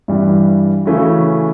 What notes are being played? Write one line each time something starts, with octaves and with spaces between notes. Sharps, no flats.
G2 E3 G3
C#3 E3 A3 C#4 F#4